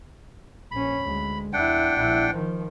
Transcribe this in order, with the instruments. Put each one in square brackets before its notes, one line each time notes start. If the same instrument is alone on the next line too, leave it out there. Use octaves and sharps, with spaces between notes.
[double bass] A#1 C#4 [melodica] B5
[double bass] D2 G#3
[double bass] E2 E4 [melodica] D4 F#5 G5
[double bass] A#1 E4
D#3 F3